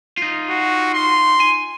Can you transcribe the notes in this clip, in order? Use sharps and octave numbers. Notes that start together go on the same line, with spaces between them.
D#4 F4
F#4
C6
G#5